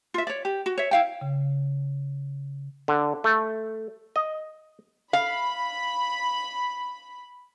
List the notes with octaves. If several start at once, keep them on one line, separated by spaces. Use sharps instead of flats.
F4 E5
C#5 D5
G4
F#4
C#5 E5
E4 F5 G5
C#3
D3
A3
D#5
F5 B5